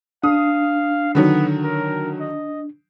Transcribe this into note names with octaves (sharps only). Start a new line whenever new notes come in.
D4 F5 D#6
D3 D#3 F#3 B3
A#4
D#5